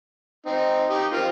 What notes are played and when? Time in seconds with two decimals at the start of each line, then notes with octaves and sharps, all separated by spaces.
0.46 C4 D#4
0.90 D#4 G4 D#5
1.12 C4 F4 A#4